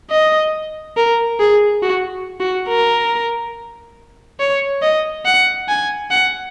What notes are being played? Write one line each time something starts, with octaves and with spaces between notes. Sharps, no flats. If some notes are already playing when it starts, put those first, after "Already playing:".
D#5
A#4
G#4
F#4
F#4
A#4
C#5
D#5
F#5
G#5
F#5